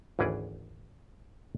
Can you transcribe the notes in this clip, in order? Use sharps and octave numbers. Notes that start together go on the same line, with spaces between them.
G#1 D2 E3 C#4 G#4 D5